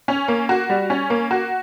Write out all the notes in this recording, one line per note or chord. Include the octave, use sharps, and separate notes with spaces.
C#4
A#3
F#4
G3
C#4
A#3
F#4